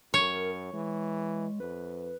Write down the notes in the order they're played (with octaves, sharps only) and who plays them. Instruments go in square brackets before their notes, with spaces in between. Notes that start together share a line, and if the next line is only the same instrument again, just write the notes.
[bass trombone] F#2 [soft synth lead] A#4 [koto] C#5
[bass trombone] E3 [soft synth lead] G#3
[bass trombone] F2 [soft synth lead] B4